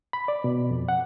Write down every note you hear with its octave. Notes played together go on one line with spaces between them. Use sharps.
B5
D5
B2
F2
F#5